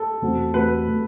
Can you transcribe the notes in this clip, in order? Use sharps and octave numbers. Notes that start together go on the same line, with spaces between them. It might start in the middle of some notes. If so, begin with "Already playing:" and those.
Already playing: A4
E2 B2 A3 C4 F#4
E2 B2 A3 C4 F#4 B4
B2 A3